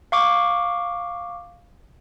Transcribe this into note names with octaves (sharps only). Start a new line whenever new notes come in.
F5 C#6 D6